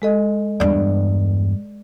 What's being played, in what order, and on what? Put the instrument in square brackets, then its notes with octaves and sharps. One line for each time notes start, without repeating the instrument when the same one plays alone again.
[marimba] G#3 A4 D#5
[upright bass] E2 G2 [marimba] D5